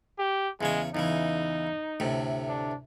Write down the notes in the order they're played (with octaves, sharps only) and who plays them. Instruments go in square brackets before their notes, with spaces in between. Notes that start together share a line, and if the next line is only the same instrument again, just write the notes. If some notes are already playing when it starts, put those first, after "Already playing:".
[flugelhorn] G4
[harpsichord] E2 C#3 C#5 [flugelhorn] G#3
[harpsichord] E2 C#3 E3 [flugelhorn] D#4
[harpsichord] D2 A2 C3
[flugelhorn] D4